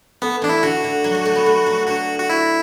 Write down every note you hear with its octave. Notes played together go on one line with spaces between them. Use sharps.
A3 B3
E3 D4
E4
D3 F#4
D3
F#3
A3
A3
B3
A3
F#3
D3 F#4
F#4
E4